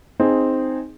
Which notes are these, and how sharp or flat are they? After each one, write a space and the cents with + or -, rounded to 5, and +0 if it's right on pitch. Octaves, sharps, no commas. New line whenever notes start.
C4 +0 D#4 +0 G#4 +0